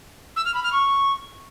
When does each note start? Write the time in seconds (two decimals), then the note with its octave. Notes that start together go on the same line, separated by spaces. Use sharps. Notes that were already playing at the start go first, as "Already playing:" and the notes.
0.36 E6
0.45 F6
0.54 B5
0.63 F6
0.72 C#6